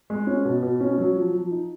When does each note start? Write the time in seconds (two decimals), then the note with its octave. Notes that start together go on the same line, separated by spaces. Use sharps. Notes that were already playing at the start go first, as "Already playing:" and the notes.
0.10 G#3
0.27 C#4
0.45 B2
0.62 B2
0.80 C#4
0.98 F#3
1.16 F3
1.34 F3
1.51 D#4